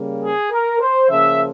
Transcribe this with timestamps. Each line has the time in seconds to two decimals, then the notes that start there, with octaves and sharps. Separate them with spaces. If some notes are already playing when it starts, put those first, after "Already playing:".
Already playing: C#3 G3 A#3
0.22 G#4
0.51 A#4
0.80 C5
1.09 C#3 F3 A#3 E5